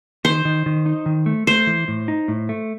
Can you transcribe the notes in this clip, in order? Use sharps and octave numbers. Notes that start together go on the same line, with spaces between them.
D#3 C5
D#3
D#3
D#4
D#3
A3
A3 C5
E3
A2
D#4
A2
A3